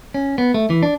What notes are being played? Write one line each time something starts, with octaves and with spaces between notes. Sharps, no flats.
C#4
B3
A3
E3
D4